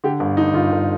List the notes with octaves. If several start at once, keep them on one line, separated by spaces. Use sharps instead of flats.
D3 G4
G1
D3 D#4
G1 F4
G1